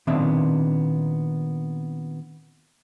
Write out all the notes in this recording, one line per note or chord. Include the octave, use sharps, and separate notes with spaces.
A#2 D#3 B3 C4 D4 E5